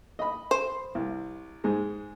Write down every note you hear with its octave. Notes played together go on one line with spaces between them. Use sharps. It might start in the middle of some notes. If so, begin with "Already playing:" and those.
D#5 B5
C5
C2
G#2 G#3